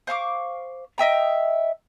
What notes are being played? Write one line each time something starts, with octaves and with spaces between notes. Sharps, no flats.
C5 F5 C#6 D6
D#5 E5 G5 A#5